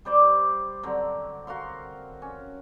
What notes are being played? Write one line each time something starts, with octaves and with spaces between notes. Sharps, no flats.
G3 C5 D5 D6
D3 F#3 C4
F#4 A#4 F5 C6
C#4